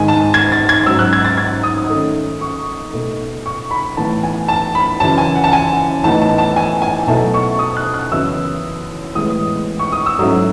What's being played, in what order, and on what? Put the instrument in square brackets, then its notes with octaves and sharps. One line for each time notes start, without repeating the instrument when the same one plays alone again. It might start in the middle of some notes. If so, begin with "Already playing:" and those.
Already playing: [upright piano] G#2 D#3 G#3 G#5
A5
G#6
A6
G#6
G#2 F#3 C#4 E6
F#6
G#6
A6
G#6
D#6
D#3 A3 C#4
C#6
B2 A3 D#4
C#6
B5
A2 E3 B3 A5
G#5
A5
B5
F#2 C#3 E3 A5
G#5
F#5
A5
G#5
A2 E3 B3 D#4 A5
A5
A5
G#5
G#5
B2 F#3 A3 E4 A5
C#6
D#6
F#6
F#6
F#2 C#3 E3 B3 E4 E6
A2 E3 G#3 B3 D#6
C#6
D#6
E6
G#2 F#3 A3 C#4 E4